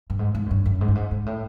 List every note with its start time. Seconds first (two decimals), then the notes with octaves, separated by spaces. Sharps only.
0.10 G2
0.19 G#2
0.35 G#2
0.46 F#2
0.51 G2
0.66 F#2
0.81 G#2
0.88 G2
0.95 G#2
1.11 G#2
1.26 A2